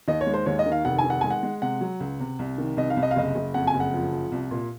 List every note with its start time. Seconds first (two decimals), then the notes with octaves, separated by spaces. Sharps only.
0.08 D#2 D#5
0.21 C#5
0.27 G#3
0.34 C5
0.46 D#2 C#5
0.59 D#5
0.66 D#3
0.72 F5
0.85 F1 F#5
0.98 G#5
1.04 D#3
1.10 F#5
1.21 G#3 G#5
1.30 F#5
1.43 G#3
1.62 C3 F#5
1.81 F#3
2.00 C#2
2.20 C3
2.39 C2
2.58 D#3
2.77 C2 D#5
2.90 F5
2.97 C2
3.03 D#5
3.11 F5
3.16 F#1 D#5
3.35 F#1
3.54 F2 F#5
3.67 G#5
3.74 F#1
3.80 F#5
3.93 F3
4.13 F3
4.32 C2
4.51 A#2